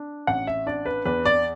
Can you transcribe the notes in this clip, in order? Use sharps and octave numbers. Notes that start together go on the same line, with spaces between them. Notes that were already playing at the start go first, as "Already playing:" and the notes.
Already playing: D4
A1 F#5
E5
D4 D5
B4
E2 B4
D5